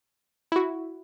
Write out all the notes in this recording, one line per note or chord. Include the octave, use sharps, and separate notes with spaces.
E4
F#4